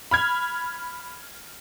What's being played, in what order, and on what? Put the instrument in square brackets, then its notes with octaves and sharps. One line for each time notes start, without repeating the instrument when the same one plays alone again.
[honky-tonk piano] B5 F6 G#6